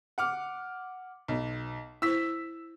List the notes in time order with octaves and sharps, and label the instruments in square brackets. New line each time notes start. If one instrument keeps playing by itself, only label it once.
[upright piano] F#5 D6 F6
B1
[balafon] E4 C5 [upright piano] E6 B6